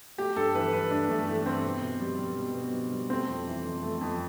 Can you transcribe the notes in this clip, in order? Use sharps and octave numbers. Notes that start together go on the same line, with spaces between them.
A3 G4
G2 A4
E3 B4
G2 B4
A3 D4
G2 A3
E3 A3
G2 C4
B2
B2
G3
G3
B2
B2
G3
G3
A3 C4
F2
E3
F2
A3
F2